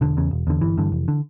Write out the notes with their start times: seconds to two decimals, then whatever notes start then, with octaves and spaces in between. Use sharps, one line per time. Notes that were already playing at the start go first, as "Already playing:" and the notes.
0.01 E1 D3
0.17 E2 C#3
0.31 E1
0.47 E2 D3
0.61 G1 E3
0.78 G2 D3
0.92 F1
1.08 D3